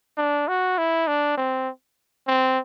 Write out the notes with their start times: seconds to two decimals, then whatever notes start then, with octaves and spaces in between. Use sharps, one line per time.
0.17 D4
0.48 F#4
0.78 E4
1.07 D4
1.37 C4
2.27 C4